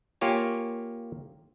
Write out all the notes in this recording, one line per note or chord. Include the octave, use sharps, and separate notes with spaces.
A#3 F4 G4 C#5 G#5